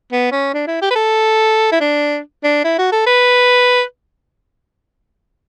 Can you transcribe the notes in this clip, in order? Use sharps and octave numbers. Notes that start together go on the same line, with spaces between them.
B3
C#4
D4
E4
G4
B4
A4
E4
D4
D4
E4
F#4
A4
B4